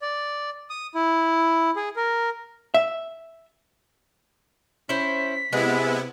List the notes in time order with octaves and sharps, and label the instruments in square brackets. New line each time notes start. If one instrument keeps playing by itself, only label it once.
[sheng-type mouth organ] D5
D#6
E4
G#4
A#4
[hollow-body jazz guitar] E5
[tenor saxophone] C#4 [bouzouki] E4 C5 [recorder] B6
[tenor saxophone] C3 [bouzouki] G#3 [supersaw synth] B3 E4